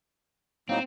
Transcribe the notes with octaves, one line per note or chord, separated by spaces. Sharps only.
A2 F#3 A#3 C4 D#4